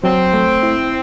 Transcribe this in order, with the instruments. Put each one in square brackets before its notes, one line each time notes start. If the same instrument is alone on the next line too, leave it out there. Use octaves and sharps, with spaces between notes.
[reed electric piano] F#3 [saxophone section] C4
[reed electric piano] A3
E4